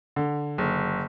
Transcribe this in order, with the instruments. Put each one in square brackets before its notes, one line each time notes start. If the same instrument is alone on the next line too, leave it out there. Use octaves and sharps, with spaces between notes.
[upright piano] D3
F#1